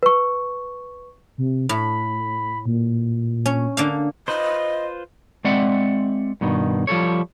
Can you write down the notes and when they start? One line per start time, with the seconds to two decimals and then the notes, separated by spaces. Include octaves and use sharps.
0.03 B4 C#6
1.38 C3
1.69 A2 B5
2.66 A#2
3.46 C#4
3.77 D3 A#3 F5
4.28 F4 B4 C5 D#5
5.45 G#3 C4 D5 E5 F#5
6.41 G2 B2 D#3
6.87 F3 G3 A4 C#5